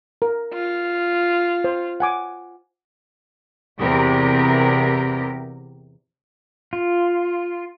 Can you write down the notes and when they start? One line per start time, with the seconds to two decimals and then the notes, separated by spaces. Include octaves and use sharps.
0.22 A#4
0.53 F4
1.64 C5
2.00 F#5 G#5 D6
3.80 E2 C3 G4 A#4
6.73 F4